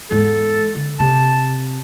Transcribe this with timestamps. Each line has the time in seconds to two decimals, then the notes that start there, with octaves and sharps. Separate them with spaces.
0.11 E2 G#2 A4
0.75 D3
1.00 C3 A5